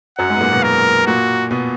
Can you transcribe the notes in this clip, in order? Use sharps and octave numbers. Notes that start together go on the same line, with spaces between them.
F#2 F#3 F#5
G#2 G#3
B3
A#2 A#3
B2 B3
A#4
A#2 A#3 F#4
B2 B3